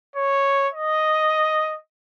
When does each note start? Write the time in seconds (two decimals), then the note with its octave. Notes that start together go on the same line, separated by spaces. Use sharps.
0.16 C#5
0.73 D#5